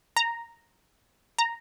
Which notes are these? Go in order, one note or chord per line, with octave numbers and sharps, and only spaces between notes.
A#5
A#5